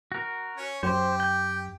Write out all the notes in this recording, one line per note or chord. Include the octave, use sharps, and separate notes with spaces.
F#4 A#4
C#4 C#5
F#2 G4 C5
G5